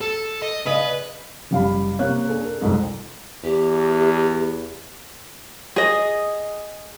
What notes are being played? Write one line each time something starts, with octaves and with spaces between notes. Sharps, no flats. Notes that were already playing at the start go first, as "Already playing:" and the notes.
A4
D#5
C#3 B4 D#5
F#1 G3 F5 B5
C3 A#3 C#5 F5 F#6
D4 G#4 A4
A#4
C2 F2 G#2 D#4
E2 G4
G#4 D#5